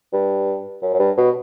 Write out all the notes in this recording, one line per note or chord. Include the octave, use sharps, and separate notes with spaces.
G2
F#2
F#2
G2
B2